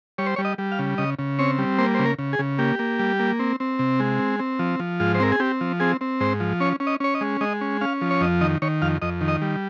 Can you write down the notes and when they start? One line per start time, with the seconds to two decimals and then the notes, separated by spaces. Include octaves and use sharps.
0.18 G3 C#5
0.26 C5
0.36 G3 C#5
0.45 D#5
0.58 G3
0.72 F5
0.79 C#3
0.98 C#3 D#5
1.19 C#3
1.39 C4 C#5
1.59 G3
1.78 A#3 C5
1.95 C#3 C5
2.06 A#4
2.19 C#3
2.33 G#4
2.39 C#3
2.59 A#3 G4
2.79 A#3
2.99 G3
3.20 A#3
3.39 C4
3.60 C4
3.79 C3
4.00 G#3
4.20 C4
4.40 C4
4.59 F3
4.80 F3
5.00 G#2 F4
5.15 C5
5.20 C4 A#4
5.32 G#4
5.40 C4 G4
5.61 F3
5.80 C4 G#4
6.01 C4
6.20 G#2 C5
6.40 F3
6.60 C#4 C#5
6.80 C#4
6.87 D#5
7.00 C#4 C#5
7.15 D#5
7.21 G#3
7.41 G#3 D#5
7.61 C#4
7.81 C#4 F5
8.01 F3
8.11 C#5
8.21 F2 D#5
8.41 D#3 D#5
8.62 D#3 C#5
8.82 F2 F5
9.02 F2 D#5
9.21 D#3
9.28 D#5
9.42 G3